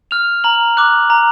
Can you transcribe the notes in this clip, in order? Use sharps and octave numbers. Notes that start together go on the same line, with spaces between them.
F6 F7
A#5 F#7
D6 F#6
A#5